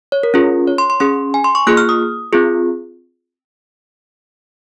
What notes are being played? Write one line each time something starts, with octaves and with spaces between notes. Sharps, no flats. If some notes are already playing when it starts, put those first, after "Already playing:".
C#5
A#4
C#4 F4 G#4
C#5
C6
C6
C#4 G#4 C6
G#5
C6
C#6
A#3 F4 G#4 F#6
F6
D#6
C4 F4 G#4